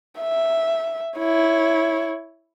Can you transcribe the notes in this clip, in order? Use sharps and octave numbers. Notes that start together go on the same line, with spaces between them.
E5
E4 C#5